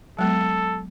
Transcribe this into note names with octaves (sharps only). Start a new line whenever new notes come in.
F#3 G#3 B3 A4